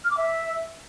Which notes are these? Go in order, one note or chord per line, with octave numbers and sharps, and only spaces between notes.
F6
D6
E5